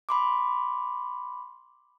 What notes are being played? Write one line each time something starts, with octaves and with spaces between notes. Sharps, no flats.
B5 C6 D6